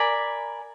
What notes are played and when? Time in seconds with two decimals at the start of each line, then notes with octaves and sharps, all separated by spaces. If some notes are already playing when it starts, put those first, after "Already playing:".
Already playing: A#4 D5 G#5 B5